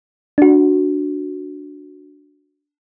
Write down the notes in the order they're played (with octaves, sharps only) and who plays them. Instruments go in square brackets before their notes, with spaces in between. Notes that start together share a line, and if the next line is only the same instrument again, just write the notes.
[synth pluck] D4 F#4